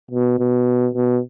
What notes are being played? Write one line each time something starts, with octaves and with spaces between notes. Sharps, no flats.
B2
B2
B2